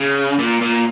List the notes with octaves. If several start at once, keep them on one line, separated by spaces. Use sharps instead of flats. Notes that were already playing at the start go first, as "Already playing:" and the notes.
Already playing: C#3
A#2
A#2